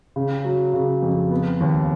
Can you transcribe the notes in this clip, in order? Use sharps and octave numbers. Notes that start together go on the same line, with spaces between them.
C#3
F#3
C#3
F2
B3
D#2